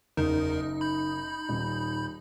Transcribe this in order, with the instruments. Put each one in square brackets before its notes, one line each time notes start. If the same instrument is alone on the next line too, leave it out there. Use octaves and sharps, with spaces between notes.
[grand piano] F#1 [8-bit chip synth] E2 A#4 [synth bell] D#4
[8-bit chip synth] B5 G6
[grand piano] D#1